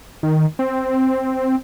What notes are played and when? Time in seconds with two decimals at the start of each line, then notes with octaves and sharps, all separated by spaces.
0.23 D#3
0.59 C4